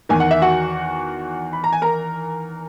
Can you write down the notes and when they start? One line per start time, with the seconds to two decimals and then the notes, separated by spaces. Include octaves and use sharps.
0.09 E2 D#3 G#5
0.20 F#5
0.31 E5
0.42 F#4 F#5
1.53 B5
1.64 A#5
1.73 G#5
1.82 A#4 A#5